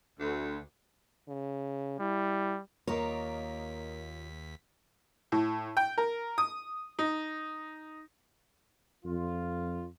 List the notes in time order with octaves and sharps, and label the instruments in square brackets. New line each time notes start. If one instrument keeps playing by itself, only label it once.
[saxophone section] D2
[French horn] C#3
[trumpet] G3 [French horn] E4
[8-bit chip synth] D#2 B6 [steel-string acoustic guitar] A#3 F4 [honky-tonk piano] A#4 D#5 A#5 [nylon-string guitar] C#5
[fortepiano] A2
G5
A#4
D#6
D#4
[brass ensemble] F2 F4